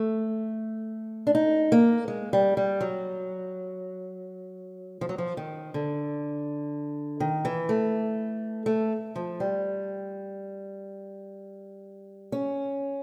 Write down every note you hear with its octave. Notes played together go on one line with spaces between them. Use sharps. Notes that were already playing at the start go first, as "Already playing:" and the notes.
Already playing: A3
D4
D#4
A#3
G#3
G3
G3
F#3
F3
F#3
F3
D#3
D3
D#3
E3
A3
A3
F3
G3
C#4